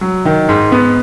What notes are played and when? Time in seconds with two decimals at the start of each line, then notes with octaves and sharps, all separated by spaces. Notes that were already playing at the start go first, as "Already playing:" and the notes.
0.01 F#3
0.25 D#3
0.49 G#2
0.72 B3